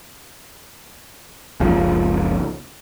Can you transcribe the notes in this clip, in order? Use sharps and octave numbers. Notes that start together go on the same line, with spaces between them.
F#1 C#2 C#3 F3